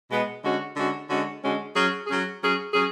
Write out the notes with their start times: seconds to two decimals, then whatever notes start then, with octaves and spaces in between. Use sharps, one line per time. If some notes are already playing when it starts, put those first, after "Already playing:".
0.10 B2 G#3 B3
0.44 D3 G#3 C#4 F#4
0.76 D3 G#3 C#4 F#4
1.09 D3 G#3 C#4 F#4
1.42 D3 G#3 C#4 F#4
1.75 F#3 C#4 G#4
2.07 F#3 C#4 G#4
2.41 F#3 C#4 G#4
2.73 F#3 C#4 G#4